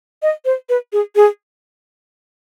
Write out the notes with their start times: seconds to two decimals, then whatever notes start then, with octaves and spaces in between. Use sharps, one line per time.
0.22 D#5
0.45 C5
0.69 B4
0.93 G#4
1.16 G#4